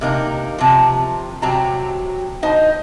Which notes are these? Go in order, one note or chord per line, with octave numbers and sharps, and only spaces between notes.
C3 A#3 D#4
C3 F3
C3 F#3 C4 A5 A#5
D#4 C5 D#5